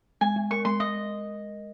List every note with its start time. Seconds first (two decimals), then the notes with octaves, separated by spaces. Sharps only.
0.21 G#3 G#5
0.36 G#3
0.51 A#4 C#6
0.65 G#3 C6
0.80 G#3 D#5